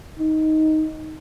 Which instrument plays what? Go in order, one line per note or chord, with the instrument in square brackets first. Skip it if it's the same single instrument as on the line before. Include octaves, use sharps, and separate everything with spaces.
[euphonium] D#4